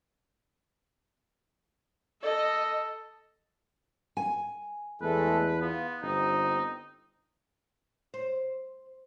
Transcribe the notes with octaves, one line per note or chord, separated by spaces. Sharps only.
A4 D#5
G#5
E2 G#3 A3 A4 B4
B3 F4
G1 C4 D#4
C5